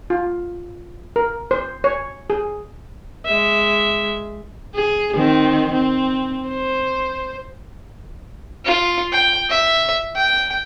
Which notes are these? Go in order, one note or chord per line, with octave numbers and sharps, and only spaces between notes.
F4
A#4
C5
C#5
G#4
G#3 E5
G#4
D#3 C4
C4
C5
F4
G5
E5
G5